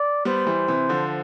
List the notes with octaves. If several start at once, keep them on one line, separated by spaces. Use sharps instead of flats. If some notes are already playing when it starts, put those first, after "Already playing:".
Already playing: D5
G3 B3 C5
E3 G3
C3 E3
D3 F3